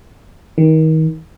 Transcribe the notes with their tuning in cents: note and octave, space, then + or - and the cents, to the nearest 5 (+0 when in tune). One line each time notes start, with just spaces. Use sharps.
D#3 +30